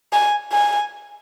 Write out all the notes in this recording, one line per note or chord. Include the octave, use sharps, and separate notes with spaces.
G#5
G#5